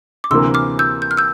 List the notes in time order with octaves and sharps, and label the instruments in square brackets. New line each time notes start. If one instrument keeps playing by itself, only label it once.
[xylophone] D6
[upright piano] D2 C3 E3 A#3 [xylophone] C6 E6
[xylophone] D6 F6
E6 G6
G6
F6
E6 G6